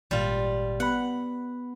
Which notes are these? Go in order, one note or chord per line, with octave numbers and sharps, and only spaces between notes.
G#1 A#2 G3 F4
B3 F#5 B5